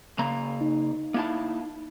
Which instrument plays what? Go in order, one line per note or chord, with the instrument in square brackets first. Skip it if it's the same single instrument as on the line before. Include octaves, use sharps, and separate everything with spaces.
[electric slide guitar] C#3 A#3 A#5
[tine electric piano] D#4
[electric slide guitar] A#3 E4 A5